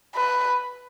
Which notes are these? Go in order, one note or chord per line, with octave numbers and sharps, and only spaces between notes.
B4